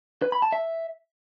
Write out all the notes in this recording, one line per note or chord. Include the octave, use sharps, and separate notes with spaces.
B4
B5
A5
E5